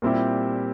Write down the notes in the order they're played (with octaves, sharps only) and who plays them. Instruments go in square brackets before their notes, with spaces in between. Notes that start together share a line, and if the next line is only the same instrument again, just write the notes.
[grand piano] A#2 G3 C4 E4 G4